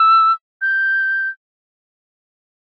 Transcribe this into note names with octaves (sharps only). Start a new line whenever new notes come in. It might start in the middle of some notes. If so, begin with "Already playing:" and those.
Already playing: E6
G6